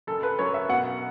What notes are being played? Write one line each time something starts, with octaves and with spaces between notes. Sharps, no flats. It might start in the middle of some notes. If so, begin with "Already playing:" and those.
F#1 A4
B4
F#2 C#5
E5
B2 F#5